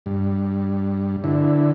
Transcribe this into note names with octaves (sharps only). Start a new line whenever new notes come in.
G2
D3 E4